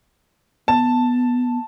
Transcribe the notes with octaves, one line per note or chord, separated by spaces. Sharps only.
B3 A5